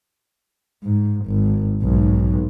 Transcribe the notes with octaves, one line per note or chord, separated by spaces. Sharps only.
G#2
G#1
B1 G#2